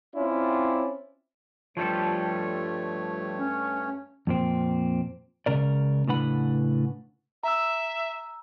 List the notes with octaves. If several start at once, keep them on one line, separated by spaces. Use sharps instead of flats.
C4 C#4 E4 F4 D5
G2 F3 G3 A3 A4 C#5
C#4
F2 A#2 C4
C#2 C#3 A#4 D5
A2 C#3 D4 B4 F#5 B5
E5 A#5 E6